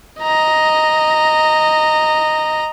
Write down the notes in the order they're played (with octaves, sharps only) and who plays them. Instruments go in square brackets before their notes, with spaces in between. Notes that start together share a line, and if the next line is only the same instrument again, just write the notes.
[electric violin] D#5 A#5